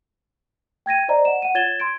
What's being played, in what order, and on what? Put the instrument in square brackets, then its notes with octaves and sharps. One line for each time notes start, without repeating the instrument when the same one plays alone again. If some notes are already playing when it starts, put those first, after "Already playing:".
[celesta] G5 G#6 A#6 D#7
C5 D5 D#5 A#5
F#5 E7
F#5 D#7
F4 C#5 G#6 A6 E7 G7
C6 G#6 D7